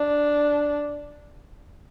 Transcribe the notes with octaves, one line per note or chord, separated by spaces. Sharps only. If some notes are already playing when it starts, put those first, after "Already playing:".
Already playing: D4